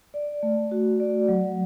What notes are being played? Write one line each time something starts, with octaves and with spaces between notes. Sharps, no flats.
D5
A3
F#4
D5
F#3